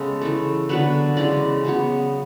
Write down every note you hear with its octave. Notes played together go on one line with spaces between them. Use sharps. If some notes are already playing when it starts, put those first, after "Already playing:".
Already playing: C#3 G#3 B3 A4
E3 A3
D3 F#3 B3 B4
C#3 E3 G#3 D5
C#3 F#3 B3